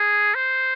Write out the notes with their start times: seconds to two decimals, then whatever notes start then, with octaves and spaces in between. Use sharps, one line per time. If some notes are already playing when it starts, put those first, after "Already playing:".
Already playing: G#4
0.35 C5